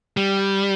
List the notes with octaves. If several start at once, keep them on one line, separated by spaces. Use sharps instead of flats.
G3